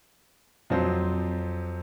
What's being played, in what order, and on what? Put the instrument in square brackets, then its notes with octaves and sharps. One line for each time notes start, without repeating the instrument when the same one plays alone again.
[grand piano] F2 F3 F#3 C5